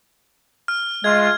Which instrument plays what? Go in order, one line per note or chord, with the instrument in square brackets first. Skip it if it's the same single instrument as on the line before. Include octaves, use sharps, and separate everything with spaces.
[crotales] F6
[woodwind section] G#3 A3 F4 [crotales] G#6